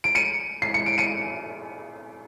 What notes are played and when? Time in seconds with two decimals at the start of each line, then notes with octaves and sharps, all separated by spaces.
0.04 D7
0.15 C#7 D#7
0.62 C7
0.74 C#7
0.86 D7
0.98 C#7 D#7